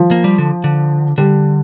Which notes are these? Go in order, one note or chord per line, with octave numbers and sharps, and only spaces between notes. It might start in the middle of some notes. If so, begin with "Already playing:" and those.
Already playing: F3
A#3
G3
D3
D3
D3 G3